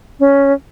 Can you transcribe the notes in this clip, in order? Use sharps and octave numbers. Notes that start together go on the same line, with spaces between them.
C#4